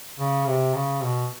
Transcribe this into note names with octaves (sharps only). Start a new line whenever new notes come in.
C#3
C3
C#3
B2